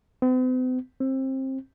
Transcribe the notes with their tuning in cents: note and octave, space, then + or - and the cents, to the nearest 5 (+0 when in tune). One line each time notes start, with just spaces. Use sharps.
C4 -45
C4 +25